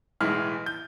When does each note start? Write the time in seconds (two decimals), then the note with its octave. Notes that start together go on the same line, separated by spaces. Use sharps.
0.21 B1 A2 E3 G#3 F6
0.66 G6